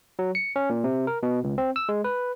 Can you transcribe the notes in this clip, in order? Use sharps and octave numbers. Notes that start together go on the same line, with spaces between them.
F#3
C#7
C#4
A#2
C3
A#4
B2
C#2
C4
E6
G#3
B4